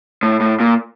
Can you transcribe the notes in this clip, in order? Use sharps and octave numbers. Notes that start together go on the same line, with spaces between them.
A2
A2
A#2